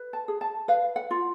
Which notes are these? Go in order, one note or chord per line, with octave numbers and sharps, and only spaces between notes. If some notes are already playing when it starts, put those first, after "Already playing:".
Already playing: B4
A5
G#4
A5
B4 F5
F#5
F4